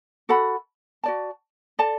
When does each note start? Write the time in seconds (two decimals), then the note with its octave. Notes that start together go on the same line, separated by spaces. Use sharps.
0.29 F#4 A4 F#5 B5
1.04 F#4 D5 A5
1.79 A4 D5 A5